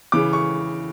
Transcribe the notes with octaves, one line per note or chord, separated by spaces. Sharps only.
C#3 E3 D6
C#6